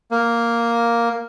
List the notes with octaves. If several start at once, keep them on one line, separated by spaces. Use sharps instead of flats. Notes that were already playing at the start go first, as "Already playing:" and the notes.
A#3